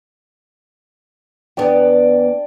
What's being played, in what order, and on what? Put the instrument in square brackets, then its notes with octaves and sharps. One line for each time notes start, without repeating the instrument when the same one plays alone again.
[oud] E2 B3 [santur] D4 D5 G5